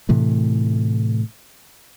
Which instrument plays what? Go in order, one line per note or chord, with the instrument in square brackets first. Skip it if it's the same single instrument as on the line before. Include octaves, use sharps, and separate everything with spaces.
[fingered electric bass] A2 C3 E3 A3